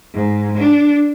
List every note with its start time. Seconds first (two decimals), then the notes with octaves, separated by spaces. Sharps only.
0.15 G#2
0.57 D4